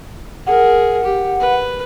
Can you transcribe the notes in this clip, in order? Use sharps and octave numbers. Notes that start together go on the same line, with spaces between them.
G#4 A#4 F#5
G4
B4